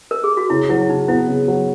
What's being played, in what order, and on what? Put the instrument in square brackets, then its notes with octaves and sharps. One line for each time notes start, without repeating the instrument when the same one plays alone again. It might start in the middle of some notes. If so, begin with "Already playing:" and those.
[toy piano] A#4
G#4
F#4
[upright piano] C#3 [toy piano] E4
[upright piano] F#3 [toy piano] E4
[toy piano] E4
[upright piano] C#3 [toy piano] D#4
[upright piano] B3 [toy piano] E4
[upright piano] C#3
F#3